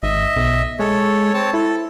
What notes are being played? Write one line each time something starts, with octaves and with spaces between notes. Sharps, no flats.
G#1 D#5 E5
B1
G#3 A4 C#5
C4 C#5 A5
E4 A4